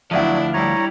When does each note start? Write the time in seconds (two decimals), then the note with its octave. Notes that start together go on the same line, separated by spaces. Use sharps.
0.11 D2 F3 F#3 D4 E4 D5 E5 F#5
0.54 G3 E4 C#5 A#5